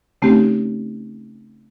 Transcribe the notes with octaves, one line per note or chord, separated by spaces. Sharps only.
C#3 A3 C4 C#4 D#4 G4